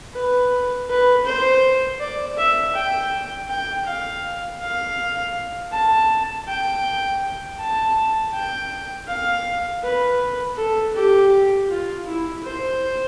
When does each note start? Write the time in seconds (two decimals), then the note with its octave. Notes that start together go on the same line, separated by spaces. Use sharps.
0.14 B4
0.89 B4
1.26 C5
2.00 D5
2.38 E5
2.76 G5
3.50 G5
3.87 F5
4.61 F5
5.73 A5
6.48 G5
7.60 A5
8.34 G5
9.08 F5
9.83 B4
10.57 A4
10.95 G4
11.69 F4
12.06 E4
12.44 C5